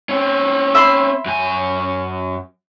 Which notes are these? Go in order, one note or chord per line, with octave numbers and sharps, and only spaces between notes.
C4 C#4
E5 B5 C6
F#2 G#5